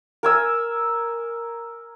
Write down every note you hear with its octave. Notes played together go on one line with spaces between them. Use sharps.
A#4 G#5 E6